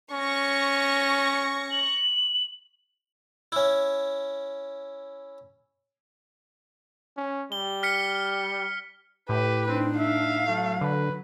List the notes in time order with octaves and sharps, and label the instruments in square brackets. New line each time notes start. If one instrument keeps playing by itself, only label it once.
[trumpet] C#4 [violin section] C#6 A#6
[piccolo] F#7
[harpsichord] C#4 E4
[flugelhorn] C#4
[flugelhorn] G3 [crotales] G7
[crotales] F6 B6 C#7
[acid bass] A2 [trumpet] G4 [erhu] B4
[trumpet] C4 [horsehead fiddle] D4 D#4
[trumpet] E5 [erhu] F5
[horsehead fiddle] F#3 [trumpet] A3
[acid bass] D3 [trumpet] B4